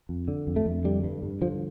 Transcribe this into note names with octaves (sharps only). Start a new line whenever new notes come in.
F2
D3
F2
A3
F2
D3 G3
G2
G2
D3 F3